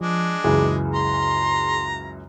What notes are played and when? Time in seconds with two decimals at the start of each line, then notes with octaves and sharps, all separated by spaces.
0.01 F3 G#3 D4
0.44 C#2 F#2 E3 G#4
0.93 A#5 C6